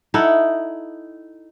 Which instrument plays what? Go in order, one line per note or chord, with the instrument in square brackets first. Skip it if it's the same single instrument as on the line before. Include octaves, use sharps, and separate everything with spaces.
[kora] D#4 E4 A4 F#5